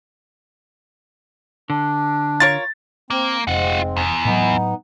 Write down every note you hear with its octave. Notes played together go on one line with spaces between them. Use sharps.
D3 D4
F4 A#4 C#5 A6
A#3 C4
F1 G#2 G#3 C4 F4 F#5
E2
A2 F#3 B3 D#4